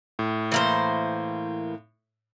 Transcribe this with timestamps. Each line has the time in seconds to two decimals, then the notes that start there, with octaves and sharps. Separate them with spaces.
0.19 A2
0.52 E3 A#3 C5